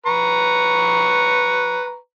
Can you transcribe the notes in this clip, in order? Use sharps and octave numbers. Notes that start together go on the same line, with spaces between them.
B4 A#5 C#6